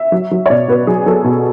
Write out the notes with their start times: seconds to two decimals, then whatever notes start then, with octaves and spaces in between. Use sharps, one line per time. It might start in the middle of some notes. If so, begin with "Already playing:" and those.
Already playing: E5
0.12 F#3
0.31 F#3
0.46 C#5
0.50 B2 D5
0.68 B2 B4
0.87 F#3 G#4
1.06 F#3 A4
1.24 B2